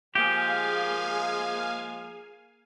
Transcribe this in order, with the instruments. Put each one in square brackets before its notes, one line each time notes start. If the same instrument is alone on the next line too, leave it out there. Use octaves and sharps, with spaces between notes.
[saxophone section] F3 G#3 [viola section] A#3 G#4 [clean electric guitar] G4 [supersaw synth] F5 G#5